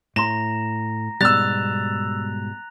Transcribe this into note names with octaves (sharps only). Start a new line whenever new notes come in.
A2 A#5 C6 A#6 E7
G#2 B2 G3 E6 F#6 A6 F7